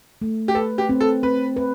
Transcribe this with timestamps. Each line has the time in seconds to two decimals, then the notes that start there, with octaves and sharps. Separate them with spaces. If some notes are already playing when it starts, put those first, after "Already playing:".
0.22 A3
0.48 G4
0.55 A4 B4
0.78 G4
0.89 C4
1.01 A4
1.23 C4 B4
1.56 B4